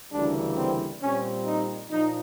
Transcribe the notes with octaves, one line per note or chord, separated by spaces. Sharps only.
D2 C#3 E3 G3 A#3 D4
C4
A#2 G3 C4 C#4
D#4
A#2 F3 D#4